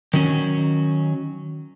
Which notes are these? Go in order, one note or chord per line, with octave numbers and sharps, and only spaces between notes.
D#3 F#3 C#4